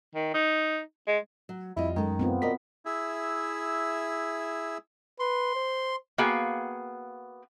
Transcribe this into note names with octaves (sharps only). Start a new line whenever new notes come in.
D#3
D#4
G#3
F#3
F2 G3 E4 F4 D#5
F#2 D#3 G#3 A4
B3 C4 F4
F#2 A#4 D5 D#5 B6
E4 G#4 E5
B4 C6
C5
A#3 B3 F#4 G#4 F5 G5